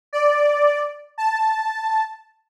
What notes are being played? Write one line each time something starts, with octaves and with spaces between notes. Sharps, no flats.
D5
A5